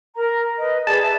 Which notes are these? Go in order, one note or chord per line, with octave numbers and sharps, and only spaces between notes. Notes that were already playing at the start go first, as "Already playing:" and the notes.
A#4 A#5
B4 D#5
G#4 B4 D5 A5
E5